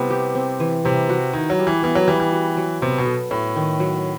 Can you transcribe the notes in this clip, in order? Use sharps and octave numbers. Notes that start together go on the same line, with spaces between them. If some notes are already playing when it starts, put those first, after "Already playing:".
Already playing: C3 G3 B3 E4
G4
C4
E3
C3 G3
F#4
D#3 E4
F#3
G3
E3
E3 B3
F#3
E3 G3
E3
F#4
F#3
C3 B3
B2
A4
A2 A3
D#3
F#3